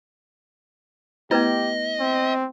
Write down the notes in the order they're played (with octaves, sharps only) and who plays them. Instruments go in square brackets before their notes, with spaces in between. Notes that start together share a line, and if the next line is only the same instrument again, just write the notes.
[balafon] A3 B3 [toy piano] E4 B4 [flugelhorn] G4 [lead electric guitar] D#5
[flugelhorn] C4